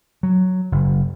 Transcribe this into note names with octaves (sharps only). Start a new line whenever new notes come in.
F#3
F#1